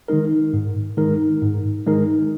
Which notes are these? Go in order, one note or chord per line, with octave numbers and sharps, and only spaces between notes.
D#3 G#3 D#4 A#4
G#2
D#3 G#3 D#4 A#4
G#2
D#3 G#3 D#4 A#4